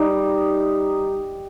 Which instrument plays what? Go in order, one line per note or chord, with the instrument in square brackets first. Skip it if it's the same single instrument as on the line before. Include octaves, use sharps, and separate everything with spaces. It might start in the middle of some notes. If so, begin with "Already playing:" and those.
Already playing: [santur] G3 D#4